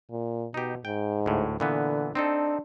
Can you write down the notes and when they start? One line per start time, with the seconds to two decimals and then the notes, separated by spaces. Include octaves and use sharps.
0.10 A#2
0.54 B2 D#4 G4
0.85 G#2 G5
1.26 D2 A2
1.60 A#2 D3 E3 B3
2.15 C4 D4 D#4 A4